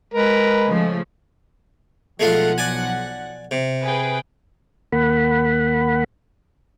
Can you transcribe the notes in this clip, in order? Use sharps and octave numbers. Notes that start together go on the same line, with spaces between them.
G#3 A#4 B4
C#3 F3 A3
B1 F3 G#3 A3 F4 F#5
D5 G#5
C3
G#4 B4 G5
D#2 A#3 F#5 B5